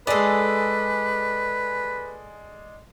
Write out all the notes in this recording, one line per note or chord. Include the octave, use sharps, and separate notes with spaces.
G#3 G#4 A4 B4 D5